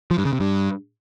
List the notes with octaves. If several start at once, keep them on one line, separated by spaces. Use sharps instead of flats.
F3
G2
C#3
C3
G2